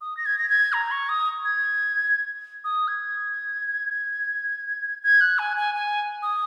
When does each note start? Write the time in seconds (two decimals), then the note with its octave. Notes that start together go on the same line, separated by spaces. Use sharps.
0.01 D#6
0.17 A#6
0.26 G#6
0.38 A#6
0.49 G#6
0.73 A#5
0.91 C#6
1.09 D#6
1.45 G#6
2.64 D#6
2.88 G#6
5.03 G#6
5.21 F#6
5.39 G#5
5.57 G#5
5.75 G#5
6.23 D#6